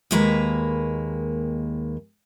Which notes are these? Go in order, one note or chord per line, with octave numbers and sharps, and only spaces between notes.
D#2 D#3 G#3 A#3 B4 A#5